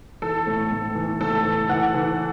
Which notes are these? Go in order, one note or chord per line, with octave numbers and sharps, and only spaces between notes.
E3 A4
A2
A2
E3
A2 A4
E3
E3 F#5
E3